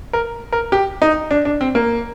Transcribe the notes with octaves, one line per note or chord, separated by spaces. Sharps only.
A#4
A#4
G4
D#4
D4
D4
C4
A#3